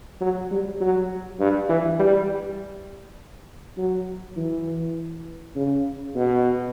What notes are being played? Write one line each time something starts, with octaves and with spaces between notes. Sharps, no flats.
F#3
G3
F#3
G2
E3
G3
F#3
E3
C#3
B2